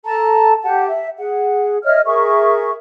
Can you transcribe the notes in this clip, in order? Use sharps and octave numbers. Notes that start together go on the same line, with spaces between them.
A4 A5 A#5
G4 F#5 A5
E5
G#4 F#5
C#5 D#5 E5 F6
G#4 A#4 E5 C#6